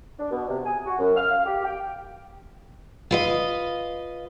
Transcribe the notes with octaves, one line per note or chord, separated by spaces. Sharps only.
D4
B2
C3
G#5
F#4
F#2
F6
F5
G4
G5
F4 B4 D#5